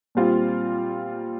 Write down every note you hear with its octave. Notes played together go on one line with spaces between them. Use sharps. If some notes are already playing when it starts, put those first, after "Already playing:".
A#2 G3 C4 F4